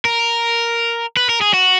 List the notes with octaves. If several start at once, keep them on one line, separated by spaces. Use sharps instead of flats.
A#4
B4
A#4
G#4
F#4